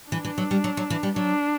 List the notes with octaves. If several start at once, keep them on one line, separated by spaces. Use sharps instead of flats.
E3 D4
E3
F#3
G3
F#3
F#3
E3
G3
F#3 D4